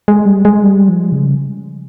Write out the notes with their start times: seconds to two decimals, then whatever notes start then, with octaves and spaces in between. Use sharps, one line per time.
0.08 G#3
0.26 G3
0.45 G#3
0.64 G3
0.88 F3
1.12 C#3